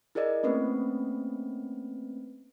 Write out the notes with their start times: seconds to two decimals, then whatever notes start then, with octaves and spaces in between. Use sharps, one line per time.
0.15 E4 G#4 A#4 D5 D#5
0.43 A3 A#3 C4 C#4 B4